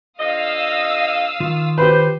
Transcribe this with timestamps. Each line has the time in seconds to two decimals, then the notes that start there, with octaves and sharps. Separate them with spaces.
0.19 D3 F3 D#5 F5 D#6 E6
1.40 D#3 F4
1.78 G4 B4 C5